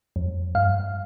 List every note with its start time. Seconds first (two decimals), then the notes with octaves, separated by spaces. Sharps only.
0.16 F2
0.55 G2 F5